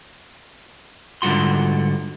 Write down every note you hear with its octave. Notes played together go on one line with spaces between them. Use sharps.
G#2 D3 G3 F4 F#4 C6